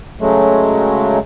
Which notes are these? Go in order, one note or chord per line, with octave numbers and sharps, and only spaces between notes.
C#3 F#3 G#3 A3